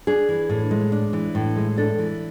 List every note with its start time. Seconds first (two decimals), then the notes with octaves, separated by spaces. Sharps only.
0.07 D4 G#4
0.29 E3
0.49 A2
0.71 G#3
0.92 D4
1.13 E3
1.35 A2
1.56 G#3
1.77 D4 A4
1.99 E3